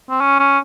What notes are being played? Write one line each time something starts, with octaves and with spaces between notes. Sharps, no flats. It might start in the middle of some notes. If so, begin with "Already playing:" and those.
C4
C#4
C#4